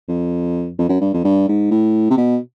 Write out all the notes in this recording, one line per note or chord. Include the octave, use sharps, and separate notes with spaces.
F2
F2
F#2
G2
F2
G2
G#2
A2
C3
B2